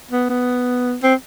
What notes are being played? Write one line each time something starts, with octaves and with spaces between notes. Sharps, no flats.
B3
B3
C4